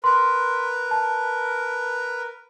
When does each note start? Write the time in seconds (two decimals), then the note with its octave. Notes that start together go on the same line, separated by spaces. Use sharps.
0.04 A#4 B4 C6
0.91 A5